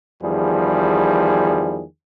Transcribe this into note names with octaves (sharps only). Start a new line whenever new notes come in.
E2 D#3 F3 G3 G#4